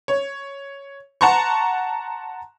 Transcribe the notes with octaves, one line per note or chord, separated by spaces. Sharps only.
C#5
F#5 A5 A#5 C6 C#6